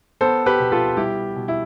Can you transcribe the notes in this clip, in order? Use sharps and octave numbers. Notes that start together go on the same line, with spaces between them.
B3 A4 C5
G4 B4
B2
F4 A4
G3 E4 G4
B2
E4